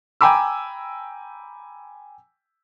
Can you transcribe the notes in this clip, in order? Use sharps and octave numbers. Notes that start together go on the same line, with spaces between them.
G5 G#5 A#5 B5 D6 E6